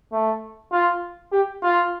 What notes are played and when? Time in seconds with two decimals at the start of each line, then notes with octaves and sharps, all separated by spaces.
0.13 A3
0.72 F4
1.32 G4
1.63 F4